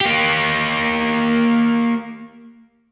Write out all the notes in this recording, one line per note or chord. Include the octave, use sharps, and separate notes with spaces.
A#3 G4